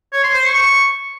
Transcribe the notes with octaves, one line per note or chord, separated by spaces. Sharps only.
C#5
C6
C5
C#6